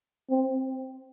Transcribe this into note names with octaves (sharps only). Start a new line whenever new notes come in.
C4